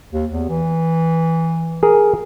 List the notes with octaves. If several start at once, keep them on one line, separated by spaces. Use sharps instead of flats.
D#2
E2
E3
G#4 A#4